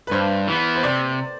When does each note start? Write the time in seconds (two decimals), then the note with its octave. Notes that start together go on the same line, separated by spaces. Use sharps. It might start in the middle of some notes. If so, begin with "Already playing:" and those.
0.07 B4
0.11 G2 C5
0.47 E3 B3
0.75 C5
0.83 C3 D5